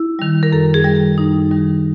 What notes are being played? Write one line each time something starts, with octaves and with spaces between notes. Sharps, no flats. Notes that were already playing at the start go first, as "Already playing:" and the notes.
Already playing: E4
D#3 G3
A#4
F#2 A4
G#4
D#3 G3
A4
F#2 D#4
D#3 G3